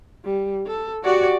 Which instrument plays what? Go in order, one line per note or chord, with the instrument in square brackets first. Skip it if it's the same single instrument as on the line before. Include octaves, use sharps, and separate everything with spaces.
[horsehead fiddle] G3
A4
[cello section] F#4 [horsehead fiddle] G4 D5